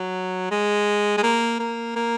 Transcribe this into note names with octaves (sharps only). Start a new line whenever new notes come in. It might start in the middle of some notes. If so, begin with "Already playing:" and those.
Already playing: F#3
G#3
G#3
A#3
A#3
A#3